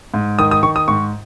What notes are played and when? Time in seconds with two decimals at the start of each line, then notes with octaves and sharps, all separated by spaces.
0.14 G#2
0.39 D#3 D#6
0.51 D#6
0.63 D#3 C#6
0.76 D#6
0.88 G#2 C#6